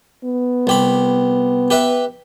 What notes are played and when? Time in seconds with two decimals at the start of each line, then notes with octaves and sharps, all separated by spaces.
0.24 B3
0.67 C2 G4 B5
1.70 G4 B4 E5